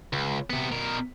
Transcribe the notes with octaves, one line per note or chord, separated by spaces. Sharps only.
C#2
C3 B3
B2 A#4